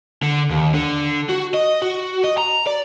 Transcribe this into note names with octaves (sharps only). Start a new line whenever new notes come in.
D3
D#2
D3
F#4
D#5
F#4
D#5
A#5
D5